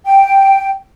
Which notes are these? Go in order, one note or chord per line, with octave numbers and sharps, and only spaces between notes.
G5